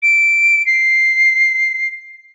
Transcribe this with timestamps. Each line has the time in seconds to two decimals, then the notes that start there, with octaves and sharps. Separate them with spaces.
0.03 D7
0.66 C7